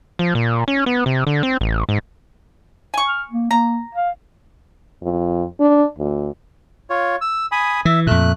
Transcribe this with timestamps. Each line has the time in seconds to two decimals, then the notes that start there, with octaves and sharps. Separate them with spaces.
0.19 F3
0.35 A#2
0.68 C#4
0.86 B3
1.06 C3
1.27 D3
1.43 C4
1.61 A1
1.89 G#2
2.94 G#5 C#6
3.08 F6
3.31 A#3
3.51 A#3 A#5
3.95 F5
5.03 F2
5.60 D4
5.98 D2
6.90 F4 C#5
7.21 E6
7.52 G#5 B5 D#6
7.85 E3 E5
8.07 F2 A#2 A3 F#6